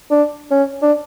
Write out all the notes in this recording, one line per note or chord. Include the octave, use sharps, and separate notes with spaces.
D4
C#4
D4